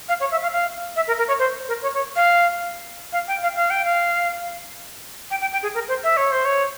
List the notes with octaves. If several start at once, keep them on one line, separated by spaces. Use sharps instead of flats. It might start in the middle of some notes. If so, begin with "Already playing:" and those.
F5
C#5
E5
F5
F5
E5
A#4
A#4
C#5
C5
A#4
C#5
C#5
F5
F5
G5
F5
F5
G5
F5
G5
G5
G5
G#4
A#4
C5
E5
C#5
C5
C#5